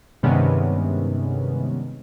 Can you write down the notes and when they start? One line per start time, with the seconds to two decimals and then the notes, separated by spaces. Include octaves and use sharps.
0.23 G2 C3 D#3 G#3 B3 C#4